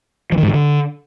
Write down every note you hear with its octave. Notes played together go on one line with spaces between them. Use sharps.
F3
D#3
G#2
D#3
D3